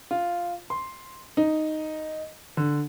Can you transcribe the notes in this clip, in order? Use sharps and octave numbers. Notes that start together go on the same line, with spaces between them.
F4
C6
D#4
D3